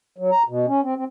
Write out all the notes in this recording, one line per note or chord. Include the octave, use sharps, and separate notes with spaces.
F#3
A#5
B2
C#4
C4
C4